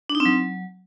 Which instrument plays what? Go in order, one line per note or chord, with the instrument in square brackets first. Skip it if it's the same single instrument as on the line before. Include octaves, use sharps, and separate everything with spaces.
[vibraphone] D4
D#4
C4
F#3